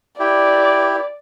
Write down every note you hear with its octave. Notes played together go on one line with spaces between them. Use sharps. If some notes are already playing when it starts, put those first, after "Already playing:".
E4 G4 D5